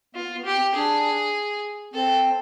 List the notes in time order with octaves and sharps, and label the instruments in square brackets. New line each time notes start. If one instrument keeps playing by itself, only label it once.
[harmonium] B3 [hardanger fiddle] F4
[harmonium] B3
[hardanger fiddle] G4
[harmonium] C4
[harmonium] D4 [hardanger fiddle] G#4
[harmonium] C4 [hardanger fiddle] A4